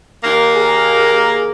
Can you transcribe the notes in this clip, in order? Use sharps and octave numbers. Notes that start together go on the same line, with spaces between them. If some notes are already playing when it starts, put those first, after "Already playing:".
D#2 A#3
G#4